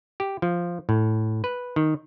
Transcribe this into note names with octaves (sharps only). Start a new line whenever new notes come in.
G4
F3
A2
B4
D#3